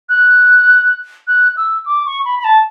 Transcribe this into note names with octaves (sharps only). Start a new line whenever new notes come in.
F#6
F#6
E6
D6
C#6
B5
B5
A5